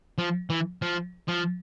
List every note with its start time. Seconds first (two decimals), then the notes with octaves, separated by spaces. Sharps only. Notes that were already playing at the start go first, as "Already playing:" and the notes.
0.18 F3
0.50 E3
0.82 F3
1.28 F3